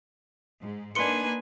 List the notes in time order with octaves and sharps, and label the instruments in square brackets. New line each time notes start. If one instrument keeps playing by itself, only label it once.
[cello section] G#2
[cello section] A#3 D4 D#4 [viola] B4 G#5 [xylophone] C6 C#7